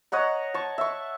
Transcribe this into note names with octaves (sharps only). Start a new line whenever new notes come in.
C#5 D#5 F#5 A#5
A5 C#6
E5 C#6